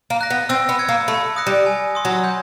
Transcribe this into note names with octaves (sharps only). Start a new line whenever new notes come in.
A#3
F#6 A#6
B3
C4 E6
B3
G#6 C#7
A#3
A3 B5
D#6 F#6 A#6 C#7
G3
G#5
C6 D#6
F#3
G6